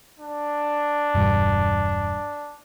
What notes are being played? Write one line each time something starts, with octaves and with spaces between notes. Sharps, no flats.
D4
E1 G2